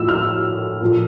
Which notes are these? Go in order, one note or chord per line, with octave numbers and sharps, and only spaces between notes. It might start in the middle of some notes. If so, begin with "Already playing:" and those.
Already playing: A2 F3 E6
F6
A#2 F3